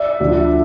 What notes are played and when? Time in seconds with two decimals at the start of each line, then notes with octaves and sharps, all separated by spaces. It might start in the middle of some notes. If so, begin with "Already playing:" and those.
Already playing: D5 E5
0.20 D2 D3 F3